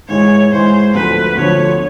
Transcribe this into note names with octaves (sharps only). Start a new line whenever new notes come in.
G#2 E3 G#3 C#5
G#2 E3 G#3 C5
D2 D3 F3 B4
D2 D3 F3 C#5